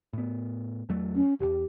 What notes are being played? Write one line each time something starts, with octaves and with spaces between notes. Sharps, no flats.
A2 B3
E2 F#3 A3
C#4
D#1 E2 G4